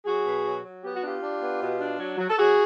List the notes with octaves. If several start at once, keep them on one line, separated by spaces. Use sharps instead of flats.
F#3 F#4 G#4
B2
F#3
F#3
B3 G4
F#4
D4 F4 G4
D4
B3
B2
D4
F#3
F#3
A4
F#3 F#4 G#4